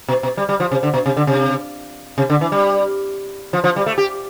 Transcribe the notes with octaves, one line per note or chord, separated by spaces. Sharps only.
B2
B2
G3
G3
F3
C3
D3
B2
C3
D3
C3
C3
D3
E3
G3
F3
F3
G3
A3
G4